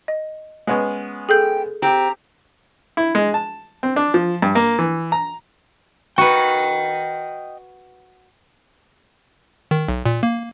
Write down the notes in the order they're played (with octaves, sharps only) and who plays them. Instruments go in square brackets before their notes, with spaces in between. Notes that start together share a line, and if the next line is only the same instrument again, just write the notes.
[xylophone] D#5
[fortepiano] G#3 B3 C#4
[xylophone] G#4 A4 G6 [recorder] G5
[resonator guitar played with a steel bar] C4 G4 [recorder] A#5
[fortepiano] E4
G#3
A5
C4
D4
F3
G2
A#3
E3
A#5
[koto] F#4 B4 [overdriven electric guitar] D#5 G5
[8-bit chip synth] D#3
B1
A#2
A#3